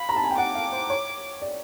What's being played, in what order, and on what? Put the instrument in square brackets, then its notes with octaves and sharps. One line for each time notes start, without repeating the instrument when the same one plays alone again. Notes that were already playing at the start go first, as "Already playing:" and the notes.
Already playing: [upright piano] F5 [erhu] B5
[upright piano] A#5
A5
G#5
G5
[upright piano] F#5 [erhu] D6
[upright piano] F5
C5
C#5
D5